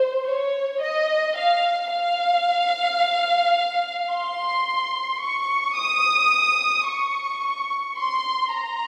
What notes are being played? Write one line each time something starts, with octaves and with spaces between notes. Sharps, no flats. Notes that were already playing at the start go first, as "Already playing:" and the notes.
Already playing: C5
C#5
D#5
F5
F5
C6
C#6
D#6
C#6
C6
A#5